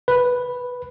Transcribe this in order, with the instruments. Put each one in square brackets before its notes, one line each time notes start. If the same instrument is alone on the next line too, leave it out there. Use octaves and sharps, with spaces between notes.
[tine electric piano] B4